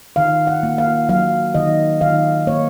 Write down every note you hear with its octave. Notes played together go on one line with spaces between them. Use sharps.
D#3 F5
F#5
A#3
F5
F#3 F5
D#3 D#5
D#3 F5
A#3 C#5